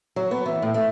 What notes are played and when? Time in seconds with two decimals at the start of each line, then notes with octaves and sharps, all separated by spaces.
0.16 F#3
0.31 B3
0.46 E3
0.62 A2
0.74 A3